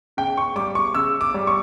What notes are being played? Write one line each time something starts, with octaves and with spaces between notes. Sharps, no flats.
C#3 G5
C#6
G3 D6
C#6
C#3 E6
D6
G3
C#6